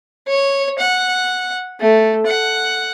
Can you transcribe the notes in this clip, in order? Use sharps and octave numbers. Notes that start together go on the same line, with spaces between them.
C#5
F#5
A3
F#5